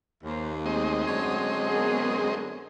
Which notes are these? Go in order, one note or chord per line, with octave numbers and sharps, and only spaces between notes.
D#2 A#3 C5
G#3 A3 C4 D#5
F#2 D3 C#5
B3 G#4 A#4